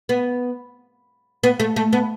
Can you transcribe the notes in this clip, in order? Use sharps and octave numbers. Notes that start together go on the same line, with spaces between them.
B3
B3
A3
A3
B3